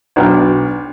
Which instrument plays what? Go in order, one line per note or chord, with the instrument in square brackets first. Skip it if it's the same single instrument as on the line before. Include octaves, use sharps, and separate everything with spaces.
[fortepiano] B1 D4 G5 F6